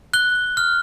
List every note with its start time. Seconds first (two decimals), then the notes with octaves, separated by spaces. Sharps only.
0.14 F#6 G7
0.57 F6